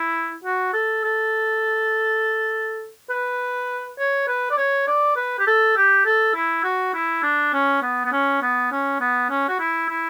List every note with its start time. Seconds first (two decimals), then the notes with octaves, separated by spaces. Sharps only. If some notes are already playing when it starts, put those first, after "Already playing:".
Already playing: E4
0.44 F#4
0.73 A4
1.04 A4
3.10 B4
3.99 C#5
4.28 B4
4.51 D5
4.57 C#5
4.87 D5
5.16 B4
5.39 G4
5.47 A4
5.76 G4
6.06 A4
6.35 E4
6.64 F#4
6.94 E4
7.23 D4
7.54 C#4
7.82 B3
8.05 B3
8.12 C#4
8.42 B3
8.72 C#4
9.00 B3
9.30 C#4
9.48 F#4
9.60 E4
9.89 E4